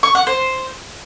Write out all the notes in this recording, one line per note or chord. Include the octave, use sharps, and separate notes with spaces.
C#6
F#5
C5